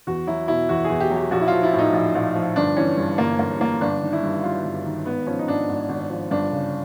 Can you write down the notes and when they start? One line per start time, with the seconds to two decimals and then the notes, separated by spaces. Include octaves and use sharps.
0.07 E2 F#4
0.27 F#3 E4
0.48 B2 E4
0.69 E2 F#4
0.84 G#4
0.89 E2
1.00 G4
1.11 F#3
1.16 G4
1.31 A#1 F#4
1.41 E4
1.48 F3 F4
1.63 E4
1.73 A2
1.79 D#4
1.93 A#1
2.15 A#1
2.35 F3
2.56 G1 D4
2.77 E3 C#4
2.97 G2
3.18 G1 A#3
3.39 G1 A#3
3.60 E3 A#3
3.81 G1 D4
4.02 D#3
4.13 E4
4.23 G2
4.43 F#3 F4
4.64 G1
4.86 D#3
5.06 G#1 B3
5.27 F3 C#4
5.39 D#4
5.47 G#2 D4
5.69 G#1
5.89 G#1
6.10 F3
6.31 G1 D4
6.52 C#3